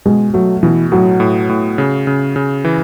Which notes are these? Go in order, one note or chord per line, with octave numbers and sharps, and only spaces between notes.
B2 G#3
F#3 A3
B2 E3
A2 F#3
A2
A2
C#3
C#3
C#3
E3